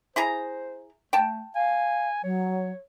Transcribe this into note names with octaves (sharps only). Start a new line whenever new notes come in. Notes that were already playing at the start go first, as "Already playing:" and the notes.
E4 G#4 C5 A#5
A3 G5 A5
F5 G#5
F#3 C#5